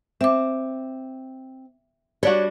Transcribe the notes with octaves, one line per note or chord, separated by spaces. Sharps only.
C4 E5 D6
G3 D4 F#4 C#5